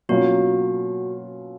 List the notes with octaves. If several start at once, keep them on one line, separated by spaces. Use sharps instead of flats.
B2 F#3 A#3 C#4 F4 F#4